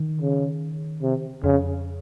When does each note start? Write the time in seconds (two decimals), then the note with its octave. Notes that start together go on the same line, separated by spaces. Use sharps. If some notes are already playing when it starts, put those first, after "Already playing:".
Already playing: D#3
0.21 C#3
1.02 C3
1.44 F2 C#3